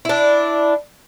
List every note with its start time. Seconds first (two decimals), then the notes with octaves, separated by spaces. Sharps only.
0.05 D4 E4